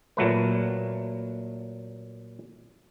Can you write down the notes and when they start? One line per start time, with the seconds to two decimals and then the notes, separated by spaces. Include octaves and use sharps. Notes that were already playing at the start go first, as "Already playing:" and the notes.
0.17 A#2 F#3 A3 B4